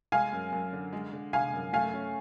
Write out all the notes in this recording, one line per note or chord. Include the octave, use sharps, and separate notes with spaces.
G#3 F5 G#5
F#2
F#2
D3
G#3
D3
G#3 F5 G#5
F#2
A3 F5 G#5
C#4